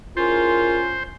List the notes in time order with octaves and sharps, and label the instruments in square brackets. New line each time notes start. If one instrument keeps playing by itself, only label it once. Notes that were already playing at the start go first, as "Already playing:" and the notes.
[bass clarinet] C#4 [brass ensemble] E4 G#4 A#4 [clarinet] F4 [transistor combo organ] C5